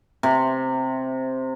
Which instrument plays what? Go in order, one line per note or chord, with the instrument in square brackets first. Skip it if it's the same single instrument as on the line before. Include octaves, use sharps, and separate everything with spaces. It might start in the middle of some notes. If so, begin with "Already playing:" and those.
[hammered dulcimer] C3